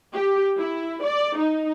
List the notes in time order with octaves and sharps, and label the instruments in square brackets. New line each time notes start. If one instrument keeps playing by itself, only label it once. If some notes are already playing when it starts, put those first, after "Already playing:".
[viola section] G4
E4
D5
D#4